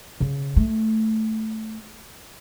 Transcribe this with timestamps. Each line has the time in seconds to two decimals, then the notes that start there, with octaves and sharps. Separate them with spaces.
0.20 C#3
0.56 A3